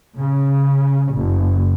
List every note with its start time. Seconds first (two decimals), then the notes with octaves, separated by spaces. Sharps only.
0.20 C#3
1.14 F#1